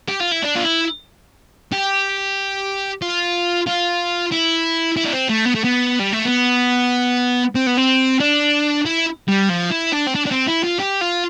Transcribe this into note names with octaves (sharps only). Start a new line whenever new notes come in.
G4
F4
E4
D4
F4
E4
G4
F4
F4
E4
E4
D4
C4
A3
B3
A3
B3
G3
A3
B3
C4
B3
C4
D4
E4
G3
F3
E4
D4
C4
D4
D4
C4
E4
F4
G4
F4